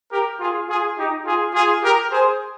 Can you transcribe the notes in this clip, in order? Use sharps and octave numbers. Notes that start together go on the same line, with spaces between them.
G4 A#4
F4 G#4
F4 G#4
D#4 G4
F4 G#4
F4 G#4
G4 A#4
G#4 C5